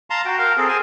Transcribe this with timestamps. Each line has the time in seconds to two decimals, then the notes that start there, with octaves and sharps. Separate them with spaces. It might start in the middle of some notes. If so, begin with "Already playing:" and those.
0.10 F5 A5 A#5 C6
0.25 F#4 G5
0.39 A#4 F5 G5
0.57 C4 G#4 A4
0.69 G#4 C5 G#5